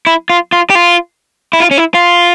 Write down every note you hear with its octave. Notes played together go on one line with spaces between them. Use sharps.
E4
F4
F4
G4
F4
E4
F4
C#4
E4
F4